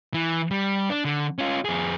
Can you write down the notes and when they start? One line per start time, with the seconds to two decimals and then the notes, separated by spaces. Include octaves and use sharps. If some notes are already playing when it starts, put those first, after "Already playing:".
0.14 E3
0.51 G3
0.90 D4
1.05 D3
1.39 C#4 F4
1.65 F2 G#4